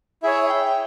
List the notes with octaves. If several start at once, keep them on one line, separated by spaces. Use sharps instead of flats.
E4 G#4 C#5 E5
G5